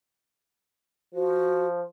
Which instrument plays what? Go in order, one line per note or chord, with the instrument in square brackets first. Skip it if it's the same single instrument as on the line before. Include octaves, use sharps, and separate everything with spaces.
[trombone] F3 [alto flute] F#4